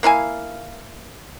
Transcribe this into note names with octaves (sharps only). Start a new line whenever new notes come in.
A#3 E4 F5 G#5